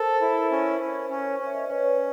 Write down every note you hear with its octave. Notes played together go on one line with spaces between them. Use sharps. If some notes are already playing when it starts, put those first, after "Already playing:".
Already playing: A4 A#4 C5
E4
C#4
C#4
C#4
C#4
E5
D#5
D5
C#4 B4 C#5